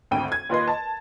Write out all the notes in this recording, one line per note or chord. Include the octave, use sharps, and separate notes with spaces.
G#1 D2 G5 D#7
G#6
D#2 F4 B4 D#5 C6
A5